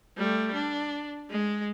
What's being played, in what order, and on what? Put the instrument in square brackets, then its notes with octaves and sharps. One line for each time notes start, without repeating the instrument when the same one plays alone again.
[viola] G3 A3
D4
G#3